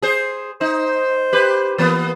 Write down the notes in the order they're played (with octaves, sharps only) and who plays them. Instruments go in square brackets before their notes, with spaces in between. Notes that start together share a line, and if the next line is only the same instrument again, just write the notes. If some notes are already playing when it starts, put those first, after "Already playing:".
[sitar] G#4 C5
[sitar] D#4 [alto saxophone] C5
[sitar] G4 B4
E3 A#3 B3